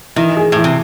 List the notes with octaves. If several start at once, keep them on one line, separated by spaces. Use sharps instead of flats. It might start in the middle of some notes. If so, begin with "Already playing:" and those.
D#3 E3
G#4
A2 E3
C3